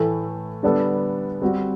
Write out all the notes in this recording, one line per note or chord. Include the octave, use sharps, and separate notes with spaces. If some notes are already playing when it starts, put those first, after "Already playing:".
Already playing: A2 E3 A3
D3 G3 B3 D4 A4
G3 C4 F#4